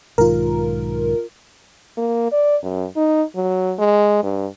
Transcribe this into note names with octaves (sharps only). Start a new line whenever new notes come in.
B1 G#2 D#3 F4 A#4
A#3
D5
F#2
D#4
F#3
G#3
G2